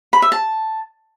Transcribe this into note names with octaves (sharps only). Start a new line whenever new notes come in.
B5
E5
A5